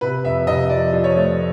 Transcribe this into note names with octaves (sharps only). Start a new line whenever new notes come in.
C3 B4
F2 E5
C3 D#5
F3 D5
F3
C#5
A3